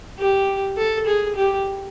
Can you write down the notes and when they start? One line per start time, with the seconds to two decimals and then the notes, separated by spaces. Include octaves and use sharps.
0.18 G4
0.77 A4
1.06 G#4
1.36 G4